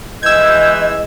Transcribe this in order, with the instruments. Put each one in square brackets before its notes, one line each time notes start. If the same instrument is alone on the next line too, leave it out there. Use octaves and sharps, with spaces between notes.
[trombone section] E3 G#3 [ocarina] D#5 [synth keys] E6 G#6 [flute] G6